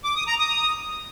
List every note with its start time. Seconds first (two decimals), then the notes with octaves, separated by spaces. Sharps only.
0.04 D6
0.16 D#6
0.27 A#5
0.39 D#6